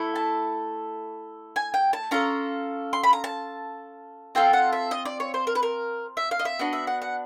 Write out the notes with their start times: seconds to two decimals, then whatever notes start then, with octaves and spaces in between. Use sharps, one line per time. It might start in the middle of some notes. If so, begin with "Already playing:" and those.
Already playing: A3 E4 A4
0.16 A5
1.56 G#5
1.74 G5
1.93 A5
2.11 C#4 F4 A4 A#5
2.93 C6
3.04 B5
3.13 A#5
3.24 A5
4.35 C4 F4 A4 G5
4.53 F#5
4.73 E5
4.91 D#5
5.05 D5
5.20 C#5
5.34 C5
5.47 A#4
5.55 B4
5.63 A#4
6.17 E5
6.31 F5
6.39 D#5
6.45 E5
6.59 B3 D4 F#4 D#5
6.73 E5
6.87 F#5
7.02 F#5